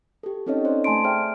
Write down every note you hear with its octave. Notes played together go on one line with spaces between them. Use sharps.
G4 A4
C4 C#4 D#4 A4 C#5 D#5
C5 D5
A3 G#5 A5 B5 C6 D7
G#4 C5 D5 E5 G5 F6